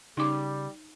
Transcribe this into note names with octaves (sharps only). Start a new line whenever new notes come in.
C#3 G3 D#4 D6